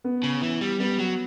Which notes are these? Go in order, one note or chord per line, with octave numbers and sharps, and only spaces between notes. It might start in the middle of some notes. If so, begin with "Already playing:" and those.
B3
C#3
E3
G3
G3 B3
F#3